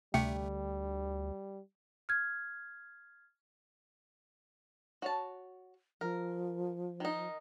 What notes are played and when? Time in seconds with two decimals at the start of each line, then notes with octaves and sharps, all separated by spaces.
0.14 D2 C3 G3 A3 G5
2.09 F6 G#6
5.02 F#4 C#5 A5
6.01 F3 A#4
7.00 D#3 D#4